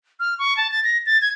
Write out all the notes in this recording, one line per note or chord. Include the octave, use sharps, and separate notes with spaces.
F6
C#6
A5
A6
A#6
A6
G#6